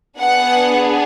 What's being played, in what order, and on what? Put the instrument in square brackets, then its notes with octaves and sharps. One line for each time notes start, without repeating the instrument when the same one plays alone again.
[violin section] B3 D4 G#4 F#5